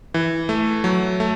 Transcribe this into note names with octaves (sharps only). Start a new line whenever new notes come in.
E3
A3
F#3
A3